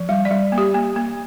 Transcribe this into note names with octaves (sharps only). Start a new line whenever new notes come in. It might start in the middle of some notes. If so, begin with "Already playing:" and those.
Already playing: F3
G3 F5
D5
G3
A#3
G4
A#3
A#3